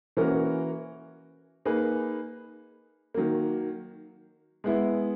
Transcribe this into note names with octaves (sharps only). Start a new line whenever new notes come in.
E3 A#3 C#4 F#4 A#4
A#3 D#4 G#4 B4
D#3 F#3 A#3
G#3 B3 E4